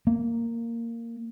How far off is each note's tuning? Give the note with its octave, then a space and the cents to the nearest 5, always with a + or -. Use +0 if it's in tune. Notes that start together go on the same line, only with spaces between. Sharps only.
A#3 -10